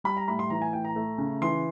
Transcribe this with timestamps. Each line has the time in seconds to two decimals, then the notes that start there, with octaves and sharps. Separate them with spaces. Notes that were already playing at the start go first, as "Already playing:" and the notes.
0.04 G3 B5
0.17 A#5
0.28 A2 B5
0.39 C6
0.50 E3 A#5
0.62 G#5
0.73 A2 G5
0.85 A#5
0.96 A3
1.18 C#3
1.41 E3 C6